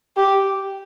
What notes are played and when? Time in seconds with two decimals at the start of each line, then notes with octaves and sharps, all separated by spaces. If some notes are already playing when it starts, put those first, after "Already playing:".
0.17 G4